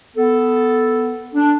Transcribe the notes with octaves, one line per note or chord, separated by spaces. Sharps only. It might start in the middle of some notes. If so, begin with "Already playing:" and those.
B3 A4
D4